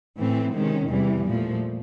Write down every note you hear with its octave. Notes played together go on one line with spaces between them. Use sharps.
A2 E3 A3 C4
C3 D#3 G#3 C#4
E2 C3 E3 G3
A#2 F3 A3